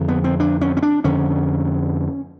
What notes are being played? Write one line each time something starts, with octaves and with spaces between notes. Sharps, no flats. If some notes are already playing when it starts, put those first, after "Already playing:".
Already playing: F2 D3
B3
C4
D4
C#4
C#4
D4
F2 D3 C#4